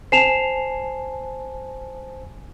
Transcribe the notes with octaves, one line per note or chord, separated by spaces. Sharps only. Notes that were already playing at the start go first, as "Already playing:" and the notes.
C5 G#5 A5 C7 E7 F7